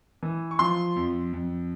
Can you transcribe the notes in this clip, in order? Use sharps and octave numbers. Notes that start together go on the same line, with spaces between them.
E3
C#6
F3 C6
F2
F2